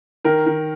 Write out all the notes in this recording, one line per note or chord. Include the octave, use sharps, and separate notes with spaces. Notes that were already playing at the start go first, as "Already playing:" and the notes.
D#3 A#4
D#3